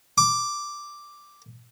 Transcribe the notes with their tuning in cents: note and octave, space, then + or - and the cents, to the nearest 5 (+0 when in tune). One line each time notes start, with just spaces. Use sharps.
D6 +0